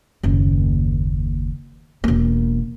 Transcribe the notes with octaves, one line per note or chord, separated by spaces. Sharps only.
F#1 D#2
E1 A#3